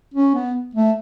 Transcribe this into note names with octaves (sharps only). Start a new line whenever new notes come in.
C#4
B3
A3